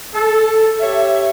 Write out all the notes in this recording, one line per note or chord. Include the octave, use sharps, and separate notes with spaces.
A4
G4 C#5 E5